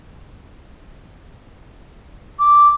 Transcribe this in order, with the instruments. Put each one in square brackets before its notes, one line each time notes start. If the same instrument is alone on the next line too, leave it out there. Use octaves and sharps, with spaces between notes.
[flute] D6